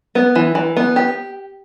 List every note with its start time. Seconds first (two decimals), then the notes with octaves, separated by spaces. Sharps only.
0.15 B3
0.35 E3
0.55 E3
0.77 B3
0.96 G4